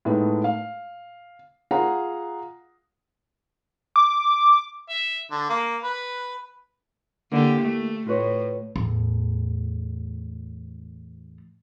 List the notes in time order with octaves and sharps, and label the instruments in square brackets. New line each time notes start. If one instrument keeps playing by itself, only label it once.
[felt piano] A2 G#3 A3 B3 D#4
F5
F4 G#4 F5 F#5 A#5
[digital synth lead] D6
[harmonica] E5
D3
A#3
B4
[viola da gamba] D3 G4 [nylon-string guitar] A#3 E4
[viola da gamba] A3
[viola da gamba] A2 [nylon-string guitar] F4 B4 C#5
[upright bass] E2 A2